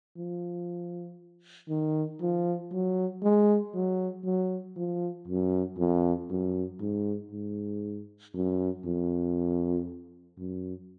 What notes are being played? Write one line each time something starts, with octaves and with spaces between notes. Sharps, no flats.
F3
D#3
F3
F#3
G#3
F#3
F#3
F3
F#2
F2
F#2
G#2
G#2
F#2
F2
F#2